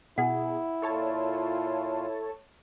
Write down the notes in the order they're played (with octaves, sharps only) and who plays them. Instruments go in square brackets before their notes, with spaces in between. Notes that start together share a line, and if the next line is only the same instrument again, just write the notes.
[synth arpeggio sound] B2 G#4 [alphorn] E4 [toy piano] F#5
[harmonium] A#2 F4 [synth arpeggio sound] A4 C#5 A5